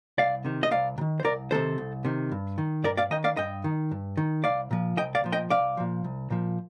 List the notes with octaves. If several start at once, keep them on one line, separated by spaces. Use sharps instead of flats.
C2 D5 F5
C3 D#3
D#5
C2 D5 F5
C3
D#3
C5
C2 A#4 D5
C3 D#3 A4 C5
C2
C3 D#3
G2
D#3
G2 A#4 D5
D5 F5
D#3 D#5 G5
D5 F5
G2 D#5 G5
D#3
G2
D#3
C2 D5 F5
A#2 F3
C2 D#5 G5
D5 F5
A#2 F3
D#5 G5
C2 D5 F5
A#2 F3
C2
A#2 F3